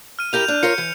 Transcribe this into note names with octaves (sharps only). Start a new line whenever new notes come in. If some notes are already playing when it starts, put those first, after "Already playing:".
F6 D#7
E4 G4 A#4 G6 F7
D4
F4 A#4 C#5 C#7
E3